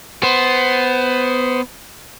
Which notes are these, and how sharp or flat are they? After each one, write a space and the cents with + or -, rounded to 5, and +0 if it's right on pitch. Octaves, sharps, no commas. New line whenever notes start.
B3 +15 C5 +0